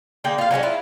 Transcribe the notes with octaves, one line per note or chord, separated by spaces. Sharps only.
D3 A#3 G#4 G5
F4 F5
F#3 G#3 C#4 D4
E4 F4